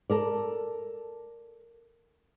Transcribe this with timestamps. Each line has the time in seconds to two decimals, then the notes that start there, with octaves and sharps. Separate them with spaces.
0.10 A4 A#4 D5